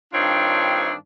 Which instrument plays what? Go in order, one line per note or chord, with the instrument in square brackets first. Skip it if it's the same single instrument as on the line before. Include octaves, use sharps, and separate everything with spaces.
[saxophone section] G2 D#3 C4 D4 F4 C#5